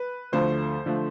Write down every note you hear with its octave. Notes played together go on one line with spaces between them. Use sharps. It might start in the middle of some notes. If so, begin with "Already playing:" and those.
Already playing: B4
D2 D3 F3 A3 C5
D3 F3 A3